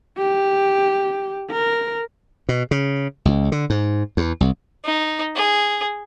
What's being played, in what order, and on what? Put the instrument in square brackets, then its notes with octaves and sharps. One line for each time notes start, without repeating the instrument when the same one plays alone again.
[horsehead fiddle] G4
A#4
[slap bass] B2
C#3
C#2
D3
G#2
E2
C2
[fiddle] D#4
G#4